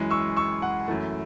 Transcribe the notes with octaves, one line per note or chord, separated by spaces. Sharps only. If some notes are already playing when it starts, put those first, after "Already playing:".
Already playing: F#2 E3 G#3
C#6 E6
C#6 E6
F#5
F#2 E3 A3